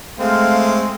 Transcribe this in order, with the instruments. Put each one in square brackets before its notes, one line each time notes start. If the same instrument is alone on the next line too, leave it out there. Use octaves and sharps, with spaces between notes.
[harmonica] G#3 C4 [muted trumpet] A3 [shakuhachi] F5